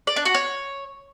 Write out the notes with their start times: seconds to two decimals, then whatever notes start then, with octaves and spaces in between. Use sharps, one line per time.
0.07 D5
0.16 D4
0.25 F#4
0.35 C#5